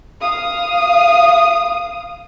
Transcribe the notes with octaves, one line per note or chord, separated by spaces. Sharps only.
F5 D#6